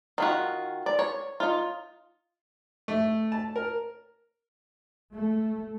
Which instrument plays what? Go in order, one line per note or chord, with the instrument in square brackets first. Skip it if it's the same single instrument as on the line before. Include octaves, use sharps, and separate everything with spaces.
[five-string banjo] D#3 F4 F#4
D5
C#5
D#4 F4
[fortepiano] A3
A5
A#4
[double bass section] A3